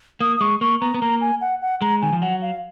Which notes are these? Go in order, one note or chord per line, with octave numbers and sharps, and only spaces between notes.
A#3 D#6
D#6
G#3 C#6
A#3 C#6
B3 A#5
B3
A#3 A#5
G#5
F#5
F#5
G#3 A#5
D#3 G#5
F3
F#3 F#5
F5